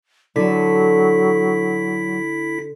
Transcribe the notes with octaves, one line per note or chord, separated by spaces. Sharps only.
D3 F#3 E4 A4 B6